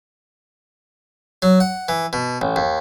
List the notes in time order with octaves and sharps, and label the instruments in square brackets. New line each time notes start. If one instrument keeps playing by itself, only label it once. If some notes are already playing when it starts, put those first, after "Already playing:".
[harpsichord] F#3
F#5
E3
B2
A1
D#2